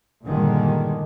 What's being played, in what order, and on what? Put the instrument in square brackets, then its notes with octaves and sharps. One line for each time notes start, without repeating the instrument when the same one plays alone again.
[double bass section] G1 A#2 D3 D#3 G3 G#3